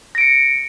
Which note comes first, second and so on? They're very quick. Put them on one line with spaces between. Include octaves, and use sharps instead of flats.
A#6 D7 C#7